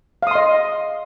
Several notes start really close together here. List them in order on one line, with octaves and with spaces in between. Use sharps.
F5 D#6 C6 D#5